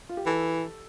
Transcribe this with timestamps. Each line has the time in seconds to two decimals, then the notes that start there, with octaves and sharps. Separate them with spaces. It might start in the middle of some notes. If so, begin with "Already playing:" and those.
0.09 F4
0.17 G4
0.26 E3 A4